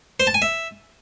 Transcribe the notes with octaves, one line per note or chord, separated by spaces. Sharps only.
C5
A5
G#5
E5